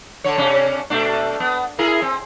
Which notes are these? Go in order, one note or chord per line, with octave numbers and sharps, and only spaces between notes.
D3 D4 C#5
C3 C#4 D4
B2 A3 D4
B3
E4 G#4 A#4
C4